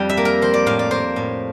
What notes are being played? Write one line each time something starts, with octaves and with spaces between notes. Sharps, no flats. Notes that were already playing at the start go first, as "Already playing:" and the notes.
Already playing: F2 G3 G5
E5
A#3
A#4
F3 C5
D5
A2 F5
D5
A#3 C5
A2